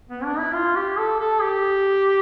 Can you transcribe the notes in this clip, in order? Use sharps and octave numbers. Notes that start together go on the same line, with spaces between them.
B3
D4
E4
F4
G4
A4
A4
G4